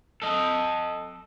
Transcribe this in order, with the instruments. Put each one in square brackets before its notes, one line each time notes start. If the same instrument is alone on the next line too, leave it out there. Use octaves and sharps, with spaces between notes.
[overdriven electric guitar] A4 D#5